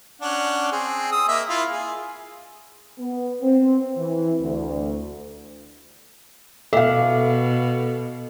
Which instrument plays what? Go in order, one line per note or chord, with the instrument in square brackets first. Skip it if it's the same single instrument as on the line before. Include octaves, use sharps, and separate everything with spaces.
[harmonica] C#4 D4 F#5
C4 G#4
D#6 E6
A#3 D#5 E5
E4 F4 F5
G#4
[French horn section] B3
C4
E3
D2
[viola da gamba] B2 [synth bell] A4 [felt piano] E5 F5